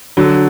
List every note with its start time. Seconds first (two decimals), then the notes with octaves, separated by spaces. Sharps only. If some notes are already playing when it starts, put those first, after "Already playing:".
0.17 D3 F#3